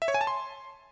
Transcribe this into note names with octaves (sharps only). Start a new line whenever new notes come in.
E5
C#5
G#5
A5
C6